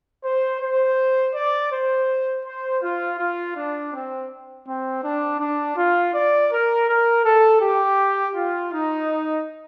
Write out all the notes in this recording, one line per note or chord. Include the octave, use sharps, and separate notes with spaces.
C5
C5
D5
C5
C5
F4
F4
D4
C4
C4
D4
D4
F4
D5
A#4
A#4
A4
G4
F4
D#4